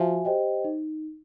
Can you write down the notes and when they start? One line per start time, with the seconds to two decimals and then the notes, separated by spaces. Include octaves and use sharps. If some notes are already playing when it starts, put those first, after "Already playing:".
Already playing: F3 F#4 E5 G#5
0.25 G4 C5 D#5 G5
0.64 D#4